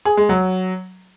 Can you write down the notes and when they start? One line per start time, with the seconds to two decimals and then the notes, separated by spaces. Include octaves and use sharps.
0.05 G#4
0.17 G#3
0.29 F#3